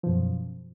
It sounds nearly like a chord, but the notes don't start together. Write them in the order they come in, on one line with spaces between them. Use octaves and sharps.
F3 B2 F#2